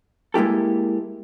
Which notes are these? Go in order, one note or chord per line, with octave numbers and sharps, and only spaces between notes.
G#3 A#3 E4 G4 A4